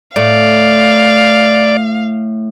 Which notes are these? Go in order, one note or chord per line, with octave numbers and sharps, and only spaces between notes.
A2 A3 D5 F5